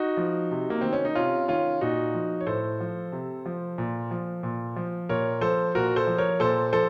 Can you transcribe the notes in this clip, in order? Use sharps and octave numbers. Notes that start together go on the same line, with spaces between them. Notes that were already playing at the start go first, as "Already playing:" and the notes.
Already playing: D#4 F#4
F3
C3
A#3
D#3 C4
C#4
D#4
C3 C#4 F4
D#3 C#4 F4
A#2 D#4 F#4
F3
C#5
A2 A4 C5
F3
C3
F3
A#2
F3
A#2
F3
A#2 A#4 C#5
F3 A4 C5
A#2 F#4 A#4
A4 C5
F3
A#4 C#5
A#2 A4 C5
F3 A4 C5